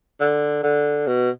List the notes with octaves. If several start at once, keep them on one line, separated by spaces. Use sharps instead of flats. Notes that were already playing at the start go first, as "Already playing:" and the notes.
D3
D3
B2